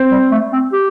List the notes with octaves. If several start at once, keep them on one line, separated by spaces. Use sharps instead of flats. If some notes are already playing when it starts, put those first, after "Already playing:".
Already playing: C4 C5
G3
A3
C4
G4